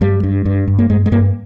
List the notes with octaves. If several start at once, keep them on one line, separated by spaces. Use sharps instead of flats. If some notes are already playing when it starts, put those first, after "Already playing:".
G2 G3
G2
G2
G2
A#3
G2 G#3
G#3
G2 A#3